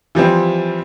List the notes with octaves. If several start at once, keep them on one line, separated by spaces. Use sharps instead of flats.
E3 F3 G3 C4